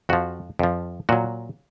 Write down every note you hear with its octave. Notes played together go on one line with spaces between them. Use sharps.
F2 F3 F#4
F2 F3
A#2 F#3 F#4